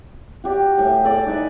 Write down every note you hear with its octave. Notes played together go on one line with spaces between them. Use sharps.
F#4 G4 D5
A2 G5 G#5
A4 D5 G#5 A5
D#4 B4 D5 G#5